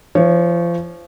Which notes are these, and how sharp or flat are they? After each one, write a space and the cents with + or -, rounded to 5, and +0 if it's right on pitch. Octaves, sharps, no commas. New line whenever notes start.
F3 -30 C#5 +0